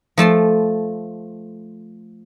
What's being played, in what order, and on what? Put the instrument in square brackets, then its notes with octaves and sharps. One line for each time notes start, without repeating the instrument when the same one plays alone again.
[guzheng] F3 A3 A5 C6